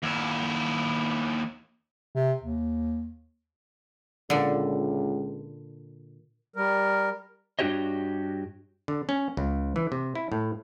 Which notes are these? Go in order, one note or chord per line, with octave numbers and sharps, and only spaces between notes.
D#2 E4
C3
D#2
C#2 A#2 D3
G3 A#4
G2 D4 F#4 G4 C#5 D#5
D3
C#4
C#2
E3
C3
E4
A2